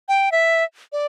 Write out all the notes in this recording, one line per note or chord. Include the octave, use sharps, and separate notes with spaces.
G5
E5
D5